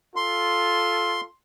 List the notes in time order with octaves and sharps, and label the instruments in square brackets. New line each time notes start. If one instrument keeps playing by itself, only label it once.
[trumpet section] F4 A4 [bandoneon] C6